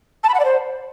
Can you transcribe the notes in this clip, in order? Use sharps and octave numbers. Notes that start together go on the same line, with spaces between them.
A5
B5
F#5
D5
C5